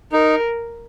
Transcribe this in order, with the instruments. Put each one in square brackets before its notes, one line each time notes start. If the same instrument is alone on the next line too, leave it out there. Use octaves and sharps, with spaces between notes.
[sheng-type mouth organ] D#4 [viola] A#4